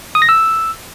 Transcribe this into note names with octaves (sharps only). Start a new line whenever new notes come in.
D#6
A#6
E6